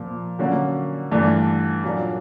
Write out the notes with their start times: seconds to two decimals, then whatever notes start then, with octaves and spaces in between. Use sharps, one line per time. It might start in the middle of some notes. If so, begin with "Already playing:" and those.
Already playing: A#2 F3 A#3
0.39 D3 F#3 A#3 C#4
1.11 G2 E3 A3 D4
1.84 A#2 F#3 A#3 D4